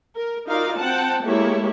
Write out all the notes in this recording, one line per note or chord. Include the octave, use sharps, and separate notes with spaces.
A#4
D#4 F4 F#4 A#4 D5 F5
C4 F#5 G5 A5
G#3 A#3 E4 G4 A4 C#5